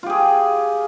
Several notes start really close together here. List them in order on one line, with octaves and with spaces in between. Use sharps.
F4 G4 G#4